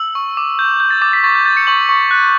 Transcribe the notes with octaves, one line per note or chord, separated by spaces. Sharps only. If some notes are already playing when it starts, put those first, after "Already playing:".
Already playing: E6 F#7
C#6
D6
G6
G6
A6
D6 A6
B6
C#6 A6
G6
G6 A6
C#7
C#6 F#7
C#6
F#6